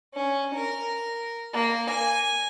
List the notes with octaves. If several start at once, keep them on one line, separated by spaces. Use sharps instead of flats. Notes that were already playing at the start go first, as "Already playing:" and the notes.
C#4
A#4
A#3
G#5